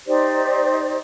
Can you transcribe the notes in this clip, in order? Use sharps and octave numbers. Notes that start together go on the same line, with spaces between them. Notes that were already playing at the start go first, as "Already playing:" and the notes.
D#4 G4 C5 D5